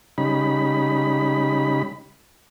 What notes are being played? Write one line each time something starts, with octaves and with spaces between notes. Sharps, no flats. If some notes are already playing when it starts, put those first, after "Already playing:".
C#3 G3 D#4 B5